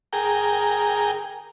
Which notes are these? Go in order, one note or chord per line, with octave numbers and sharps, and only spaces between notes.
G#4 A#4 G5